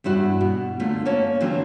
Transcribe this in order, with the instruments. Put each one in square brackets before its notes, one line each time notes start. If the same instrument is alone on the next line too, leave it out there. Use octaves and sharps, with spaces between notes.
[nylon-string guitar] E2 G2 E4 F#4
B2
D3 A3 A#3 F4
A#3 C#4 C#5 A5
D3 E3 F#3 C4 F4